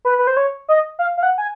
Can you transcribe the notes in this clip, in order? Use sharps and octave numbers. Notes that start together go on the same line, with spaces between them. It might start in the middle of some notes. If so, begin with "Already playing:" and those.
B4
B4
C5
C#5
D#5
F5
F5
F#5
G#5